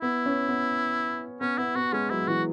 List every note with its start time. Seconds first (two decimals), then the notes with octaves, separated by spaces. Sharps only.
0.02 B3 E4
0.26 C#4
0.49 B3
1.40 B3 C#4
1.58 B3 E4
1.75 B3 F#4
1.93 G#3 C#4
2.10 F#3 E4
2.27 E3 F#4